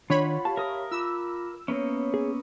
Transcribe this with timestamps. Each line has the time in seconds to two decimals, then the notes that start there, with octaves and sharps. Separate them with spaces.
0.10 D#3 D4 F4 C#5 F#5 B5
0.45 G4 F5 A5
0.57 A#4 E5 D#6
0.91 F4 B5 D6 E6
1.68 A#3 B3 C#4 C#5 E5 C#7
2.14 G#4